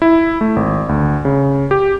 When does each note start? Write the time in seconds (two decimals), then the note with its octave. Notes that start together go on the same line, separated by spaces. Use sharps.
0.02 E4
0.41 A3
0.56 G#1
0.89 D2
1.25 C#3
1.71 G4